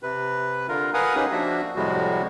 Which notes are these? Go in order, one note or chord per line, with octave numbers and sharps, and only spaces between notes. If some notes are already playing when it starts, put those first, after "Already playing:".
C3 B4
D3 F4 A#4
A#4 B4 F5 F#5 G#5 D#6
C#4 D#4 G4 G#4 B4
F3 A#3 D4 F#4 E5
F2 A2 C3 G3 G#3 F#4